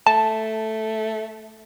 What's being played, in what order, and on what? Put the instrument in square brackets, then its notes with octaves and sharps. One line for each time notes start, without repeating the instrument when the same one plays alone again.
[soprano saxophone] A3 [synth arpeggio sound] A5